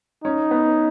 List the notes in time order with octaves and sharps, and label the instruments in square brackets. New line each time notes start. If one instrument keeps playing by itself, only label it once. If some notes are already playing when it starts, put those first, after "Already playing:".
[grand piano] C#4 [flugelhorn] D#4
[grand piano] B3